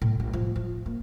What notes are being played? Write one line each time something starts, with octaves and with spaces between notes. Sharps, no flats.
A2
A1
F3
F3
A#3